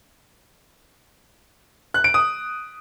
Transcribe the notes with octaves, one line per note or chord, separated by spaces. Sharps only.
F#6
D7
D#6